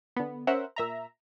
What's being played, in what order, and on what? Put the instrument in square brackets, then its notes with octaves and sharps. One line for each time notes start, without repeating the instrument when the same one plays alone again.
[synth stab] D3 B3
C#4 A#4 C5 E5 F#5
A#2 E5 A#5